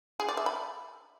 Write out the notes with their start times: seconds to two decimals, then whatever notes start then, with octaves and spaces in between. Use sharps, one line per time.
0.20 G#4
0.28 D5
0.37 E5
0.46 B5